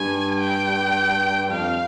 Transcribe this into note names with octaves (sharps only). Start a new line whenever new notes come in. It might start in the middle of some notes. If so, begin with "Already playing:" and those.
Already playing: G2 G#5
G5
F2 F5